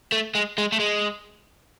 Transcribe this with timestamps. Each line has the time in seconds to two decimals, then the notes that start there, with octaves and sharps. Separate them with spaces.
0.12 A3
0.35 G#3
0.58 G#3
0.72 A3
0.79 G#3